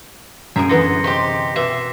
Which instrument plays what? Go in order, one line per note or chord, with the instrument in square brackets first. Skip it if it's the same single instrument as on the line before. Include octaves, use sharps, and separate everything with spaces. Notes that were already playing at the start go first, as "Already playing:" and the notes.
[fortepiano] F#2 [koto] G#4 A#4 E5 [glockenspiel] C7
[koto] D3 E3 B3 [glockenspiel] C6 A#6 C#7
[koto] C3 [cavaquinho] G4 D#5 C6 [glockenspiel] B6
[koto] B2 [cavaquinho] E5 [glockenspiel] D6 C7